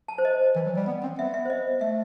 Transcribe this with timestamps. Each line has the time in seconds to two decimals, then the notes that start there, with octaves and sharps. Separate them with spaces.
0.08 A5
0.18 C5
0.25 D#5
0.56 E3
0.66 F#3
0.76 G3
0.87 B3
1.03 C4
1.18 B3 E5
1.34 E5
1.45 C5
1.50 D#5
1.81 A3 E5